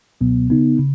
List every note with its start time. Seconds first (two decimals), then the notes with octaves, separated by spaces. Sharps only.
0.21 C#2 B2 F#3 B3
0.50 C#3 B3 D#4
0.79 C#3